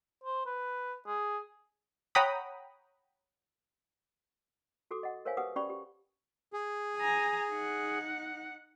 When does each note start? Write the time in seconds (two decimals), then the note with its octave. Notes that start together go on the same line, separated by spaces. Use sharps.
0.24 C5
0.46 B4
1.07 G#4
2.15 C#5 F#5 G5 A#5 B5 D#6
4.91 F#4 G#4 A4 D6
5.03 D#5 F#5
5.25 A#4 C5 C#5 E5 F5 G#5
5.37 G4 G#4 B4 F#5 D#6
5.56 C#4 G4 D5 B5 C#6
5.70 G4
6.53 G#4
6.97 G#5 A#5
7.51 D#4 F#5